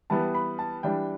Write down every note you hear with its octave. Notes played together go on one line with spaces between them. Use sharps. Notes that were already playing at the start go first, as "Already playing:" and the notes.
E3 G3 B3 A5
B5
A5
E3 G3 D4 G5